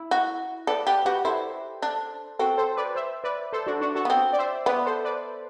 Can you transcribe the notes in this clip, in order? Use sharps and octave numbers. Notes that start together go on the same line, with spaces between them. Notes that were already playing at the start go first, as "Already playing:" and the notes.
Already playing: E4
F#4
A4 B4 D5
G4 B4 D5
F#4 G4 B4
E4 A4 C5
D4
C4 F#4 A4
A4 C5
B4 D5
C5 E5
B4 D5
A4 C5
D4 F#4
D4 F#4
F#4 A4
B3
C4
D5
C5 E5
B3 B4 D5
A4 C5
B4 D5